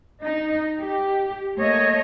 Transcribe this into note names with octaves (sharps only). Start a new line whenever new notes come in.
D#4
G4
A3 A#3 C#5 D#5